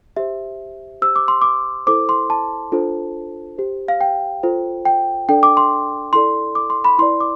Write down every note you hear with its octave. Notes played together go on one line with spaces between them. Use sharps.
G4 C5 E5
G4 C5 E6
D6
C6
D6
E4 A4 C5 D6
C6
A5
D4 F4 A4 C5
G4 C5
F5
G5
F4 A4 C5
G5
D4 A4 D5 G5
D6
C6
E4 A4 D5 C6
D6
C6
B5
E4 B4 D5 C6
D6